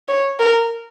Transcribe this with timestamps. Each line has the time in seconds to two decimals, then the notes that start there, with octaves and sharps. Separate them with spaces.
0.08 C#5
0.40 A#4